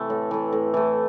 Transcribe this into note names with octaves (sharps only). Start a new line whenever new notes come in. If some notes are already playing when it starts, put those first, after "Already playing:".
Already playing: C3 E3 A3
A2 A4
E3 A3
A2
E3 A3